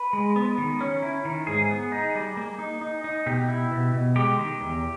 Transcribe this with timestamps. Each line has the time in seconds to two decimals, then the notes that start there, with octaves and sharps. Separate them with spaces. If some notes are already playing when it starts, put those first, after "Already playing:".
Already playing: B4
0.13 G#3
0.36 B3
0.58 D#3
0.81 C#4
1.02 E4
1.25 D#3
1.47 G#2 G#4
1.70 B3
1.92 D#4
2.15 G3
2.37 A#3
2.59 D#4
2.82 D#4
3.04 D#4
3.26 B2 G4
3.48 E4
3.71 B2
3.94 B2
4.16 G#3 G4
4.38 D#3
4.60 E2